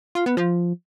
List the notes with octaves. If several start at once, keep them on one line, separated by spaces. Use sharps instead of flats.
F4
B3
F3